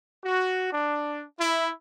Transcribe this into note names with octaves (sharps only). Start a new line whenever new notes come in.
F#4
D4
E4